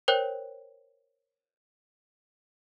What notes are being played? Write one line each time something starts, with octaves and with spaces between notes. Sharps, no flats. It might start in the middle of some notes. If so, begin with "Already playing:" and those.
A#4 C5 C#5 G5 F#6